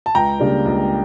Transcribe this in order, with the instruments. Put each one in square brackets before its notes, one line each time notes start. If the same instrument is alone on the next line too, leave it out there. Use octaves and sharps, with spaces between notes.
[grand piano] A5
C#2 G5 A#5
C#3 G3 A#3 D4
C#2